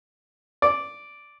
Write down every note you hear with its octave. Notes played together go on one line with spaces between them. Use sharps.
D5